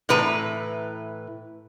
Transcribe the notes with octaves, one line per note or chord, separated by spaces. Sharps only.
A2 E3 B4 A#5